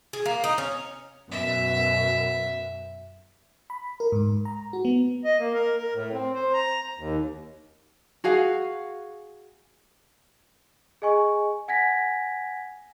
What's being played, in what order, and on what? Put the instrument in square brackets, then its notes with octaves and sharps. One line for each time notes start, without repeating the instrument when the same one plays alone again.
[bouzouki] G#4
A#3
D#4
C#4
[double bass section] F#2 B2 [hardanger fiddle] E5
[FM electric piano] B5
A#4
G#2
A#5
F#4
B3
[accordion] D#5
A#3
A#4
A#4
A2
C4
C5
A#5
D#2
[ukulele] F#4 G#4 F5
[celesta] G#4 D#5 G#5 C#6
F#5 G#5 G#6 A#6 B6